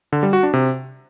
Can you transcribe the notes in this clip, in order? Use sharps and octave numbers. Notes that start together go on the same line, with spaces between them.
D3
G3
F#4
D4
C3